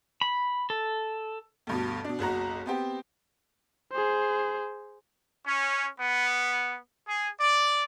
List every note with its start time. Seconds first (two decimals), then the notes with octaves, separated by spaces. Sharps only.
0.21 B5
0.70 A4
1.67 D2 G2 B2
2.04 B2 D4
2.19 F#1 B1 F#4 A#5
2.66 B3 C4 G4
3.92 G#4 C5
5.47 C#4
5.99 B3
7.08 G#4
7.40 D5